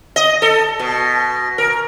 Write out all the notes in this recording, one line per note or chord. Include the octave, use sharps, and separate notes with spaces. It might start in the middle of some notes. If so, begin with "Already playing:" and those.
D#5
A4
B2
A#4